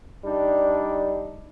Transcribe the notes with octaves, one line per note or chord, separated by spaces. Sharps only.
G3 D4 D#4